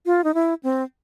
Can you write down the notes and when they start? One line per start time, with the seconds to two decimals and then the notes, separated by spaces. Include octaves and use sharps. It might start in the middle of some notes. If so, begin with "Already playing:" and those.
0.06 F4
0.24 D#4
0.34 E4
0.63 C4